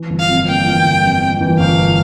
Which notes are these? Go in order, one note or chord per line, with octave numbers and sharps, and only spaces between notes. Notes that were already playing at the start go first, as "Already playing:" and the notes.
Already playing: E3
G1
F5
F2
A#3 G5
E3
G1
F2
A#3
E3
G1 F5